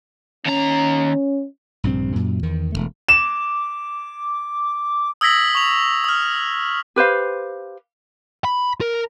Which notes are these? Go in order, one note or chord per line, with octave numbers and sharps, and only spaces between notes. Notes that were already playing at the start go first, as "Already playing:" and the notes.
D#2 C#4 A#5
A#1 G2 C3 C4
F#2 A#2
E2 D#3
E1 D#2 A3
D6 E7
D#6 E6 G#6 A#6 B6 F#7
C#6 F7
D#6 F6
G4 B4 C5 F5
B5
A#4